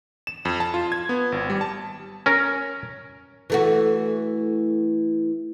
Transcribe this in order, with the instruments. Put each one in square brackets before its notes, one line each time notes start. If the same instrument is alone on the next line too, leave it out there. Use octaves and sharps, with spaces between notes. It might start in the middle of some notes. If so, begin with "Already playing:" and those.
[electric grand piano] E7
F2
A5
F4
G#6
B3
G#1
G3
A5
[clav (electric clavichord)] C#4 A#4
[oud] E3 A3 F#4